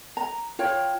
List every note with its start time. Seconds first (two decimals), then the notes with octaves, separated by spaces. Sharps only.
0.17 A#5
0.59 F4 C#5 G5